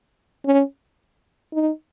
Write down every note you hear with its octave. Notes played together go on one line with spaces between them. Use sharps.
C#4
D#4